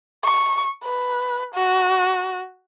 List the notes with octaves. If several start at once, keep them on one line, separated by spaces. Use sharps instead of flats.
C#6
B4
F#4